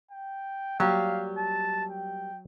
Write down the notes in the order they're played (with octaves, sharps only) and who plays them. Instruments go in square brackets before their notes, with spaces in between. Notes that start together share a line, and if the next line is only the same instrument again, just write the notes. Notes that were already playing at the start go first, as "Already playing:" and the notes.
[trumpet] G5
[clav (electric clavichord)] F#3 [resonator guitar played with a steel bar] G3 A#3 G4 [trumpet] F5
[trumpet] A5
G5